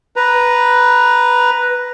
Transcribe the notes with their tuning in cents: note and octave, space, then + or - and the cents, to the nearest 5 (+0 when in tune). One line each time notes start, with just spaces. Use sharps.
B4 +0 A#5 +5